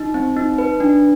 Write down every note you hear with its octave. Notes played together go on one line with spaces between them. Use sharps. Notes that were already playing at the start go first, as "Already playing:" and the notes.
Already playing: D#4
C4
D#4
B4
D4